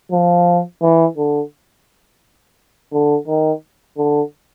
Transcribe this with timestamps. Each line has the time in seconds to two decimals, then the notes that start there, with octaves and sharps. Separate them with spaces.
0.12 F3
0.82 E3
1.17 D3
2.92 D3
3.27 D#3
3.97 D3